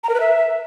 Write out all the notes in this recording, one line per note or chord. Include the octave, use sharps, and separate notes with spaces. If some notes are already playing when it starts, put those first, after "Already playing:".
A#5
A#4
B4
E5